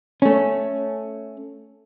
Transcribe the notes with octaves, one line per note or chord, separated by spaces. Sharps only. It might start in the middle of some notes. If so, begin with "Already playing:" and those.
A3 C#4